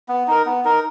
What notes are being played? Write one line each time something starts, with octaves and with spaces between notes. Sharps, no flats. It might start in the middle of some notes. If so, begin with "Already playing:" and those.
B3
D#4 A#4
B3
D#4 A#4